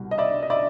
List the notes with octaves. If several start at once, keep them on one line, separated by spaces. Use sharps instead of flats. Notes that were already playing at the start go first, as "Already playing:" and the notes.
Already playing: C2 B2 G3
D#5
D5 E5
D#5
D5 E5